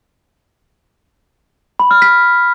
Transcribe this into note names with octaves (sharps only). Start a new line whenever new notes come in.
B5
F6
B6